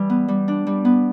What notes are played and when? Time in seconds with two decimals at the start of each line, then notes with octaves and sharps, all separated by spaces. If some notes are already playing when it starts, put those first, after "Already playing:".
Already playing: E3 G3
0.10 B3
0.28 G3
0.48 D4
0.67 G3
0.85 B3